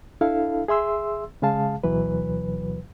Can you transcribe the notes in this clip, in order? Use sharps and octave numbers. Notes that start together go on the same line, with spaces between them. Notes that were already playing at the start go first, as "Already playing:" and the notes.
D4 E4 A4 F5
G#4 E5 C6 E6
C#3 G#3 G#4 F5 A5
D2 B2 E3 F#3 B4